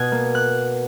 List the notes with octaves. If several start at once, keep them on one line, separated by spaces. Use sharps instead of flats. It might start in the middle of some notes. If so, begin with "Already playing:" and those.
Already playing: B2 D#6 F#6 G#6
A#3
F#6